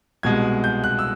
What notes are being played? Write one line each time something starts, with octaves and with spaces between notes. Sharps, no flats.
C2 B2 G#3 G#6
G6
F#6
E6